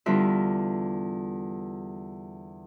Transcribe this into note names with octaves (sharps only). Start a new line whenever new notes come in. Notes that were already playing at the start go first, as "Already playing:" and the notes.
E2 D3 G3 F4 B4 E5